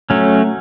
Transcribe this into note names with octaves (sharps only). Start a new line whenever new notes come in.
F#3 A3 C#4